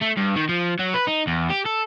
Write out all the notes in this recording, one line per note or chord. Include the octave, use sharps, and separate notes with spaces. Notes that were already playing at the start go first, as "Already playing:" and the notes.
A3
G2
D#3
F3
F#3
B4
D#4
E2
G4
A4